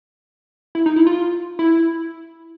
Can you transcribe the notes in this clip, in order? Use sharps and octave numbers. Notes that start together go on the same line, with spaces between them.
E4
D#4
E4
F4
E4